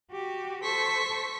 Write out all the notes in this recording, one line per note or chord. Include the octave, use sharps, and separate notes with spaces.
F#4 G4
A4 C5 C#6 B6